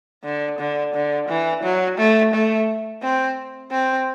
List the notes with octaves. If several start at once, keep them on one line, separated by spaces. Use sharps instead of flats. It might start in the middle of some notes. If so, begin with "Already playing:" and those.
D3
D3
D3
E3
F#3
A3
A3
C4
C4